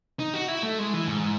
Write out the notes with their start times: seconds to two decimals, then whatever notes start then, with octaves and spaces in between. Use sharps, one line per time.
0.19 D#4
0.34 F#4
0.48 E4
0.63 A3
0.79 G#3
0.93 E3
1.08 G#2